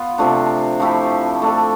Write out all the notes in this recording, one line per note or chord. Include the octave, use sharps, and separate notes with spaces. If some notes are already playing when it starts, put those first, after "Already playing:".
Already playing: B3 F4
C3 F3 A3 D4
F3 A3 E4 G4
A3 D4 A4